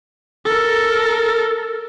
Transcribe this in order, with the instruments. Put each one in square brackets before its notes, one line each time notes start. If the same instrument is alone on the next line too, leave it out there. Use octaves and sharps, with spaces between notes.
[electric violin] A4 A#4